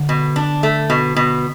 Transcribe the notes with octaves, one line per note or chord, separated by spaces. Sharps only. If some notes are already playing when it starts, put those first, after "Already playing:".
Already playing: D3
B2
D4
A3
B2
B2